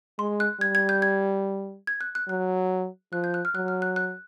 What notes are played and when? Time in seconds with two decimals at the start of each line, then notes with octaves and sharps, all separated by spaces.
0.19 G#3 C6
0.40 F#6
0.60 G3 G#6
0.75 G#6
0.89 G6
1.02 G#6
1.87 G#6
2.01 F#6
2.15 F#6
2.28 F#3 F#6
3.13 F3 F#6
3.24 G6
3.34 F#6
3.45 F6
3.55 F#3 F#6
3.68 F6
3.82 F#6
3.96 F#6